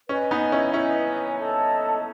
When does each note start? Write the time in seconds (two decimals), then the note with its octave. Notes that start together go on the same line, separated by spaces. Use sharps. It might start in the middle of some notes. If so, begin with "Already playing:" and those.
0.09 C#4 B4 D#5 G#5
0.31 B3 D#4
0.52 C#4 E4
0.73 C#4 E4 B4 D#5 G#5
1.39 A4 D#5 A5